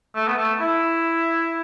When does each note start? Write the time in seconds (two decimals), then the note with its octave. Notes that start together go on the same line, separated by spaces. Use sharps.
0.15 A3
0.28 B3
0.37 A3
0.60 E4